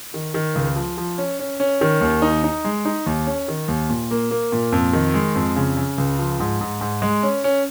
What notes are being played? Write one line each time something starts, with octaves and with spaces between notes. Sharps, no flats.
D#3
D#3
C#2
F3
F3
C#4
C#4
C#4
D#3
D#2
D#4
D#4
G#3
D#4
D#2
C#4
D#3
D#2
A#2
A#3
A#3
A#2
F2
D#3
G#3
F2
C#3
C#3
C#2
F3
G#2
G#2
G#2
G#3
C#4
C#4